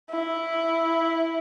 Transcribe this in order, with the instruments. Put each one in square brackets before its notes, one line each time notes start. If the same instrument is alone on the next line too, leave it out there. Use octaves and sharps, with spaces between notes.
[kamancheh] E4